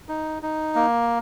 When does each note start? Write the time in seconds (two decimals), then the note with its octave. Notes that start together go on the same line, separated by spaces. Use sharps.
0.09 D#4
0.42 D#4
0.75 A#3